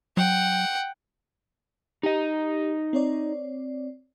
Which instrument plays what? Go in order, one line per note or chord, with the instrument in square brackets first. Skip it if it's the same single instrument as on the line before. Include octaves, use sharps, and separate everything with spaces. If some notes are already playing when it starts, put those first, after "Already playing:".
[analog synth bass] F#3 [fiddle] F#5 G5
[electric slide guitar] D#4 D#5 [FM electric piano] G4
[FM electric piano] C4 C#5 D5